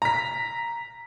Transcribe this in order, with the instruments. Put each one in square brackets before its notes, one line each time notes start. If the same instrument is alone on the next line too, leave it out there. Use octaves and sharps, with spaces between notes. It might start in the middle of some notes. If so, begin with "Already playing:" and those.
[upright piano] A#5 B6